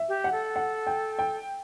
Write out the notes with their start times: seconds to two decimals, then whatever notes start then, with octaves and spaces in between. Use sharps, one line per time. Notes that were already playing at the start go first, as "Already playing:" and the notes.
Already playing: E5
0.09 G4
0.24 F#5
0.32 A4
0.56 F#5
0.87 G5
1.19 G5